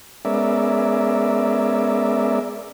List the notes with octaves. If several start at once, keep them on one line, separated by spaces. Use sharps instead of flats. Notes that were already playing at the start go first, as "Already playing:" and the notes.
G#3 B3 C#4 A#4 D5 E5